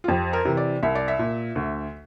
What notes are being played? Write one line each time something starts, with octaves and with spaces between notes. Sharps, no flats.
F4
F2 G4
A#4
C3 E3
D5
C2 E5
D5
E5
A#2
D2